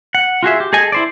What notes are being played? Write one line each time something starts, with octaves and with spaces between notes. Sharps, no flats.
F#5
F4 F#4 G#4 E5
G4
G#4 A4 D#5 G#5
E4 C5 D5